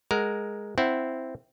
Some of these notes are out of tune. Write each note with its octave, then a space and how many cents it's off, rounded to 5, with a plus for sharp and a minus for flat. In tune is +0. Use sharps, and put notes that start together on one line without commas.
G#3 +0 A#4 +0 F#5 +0
C4 +0 E4 +0 F#5 +15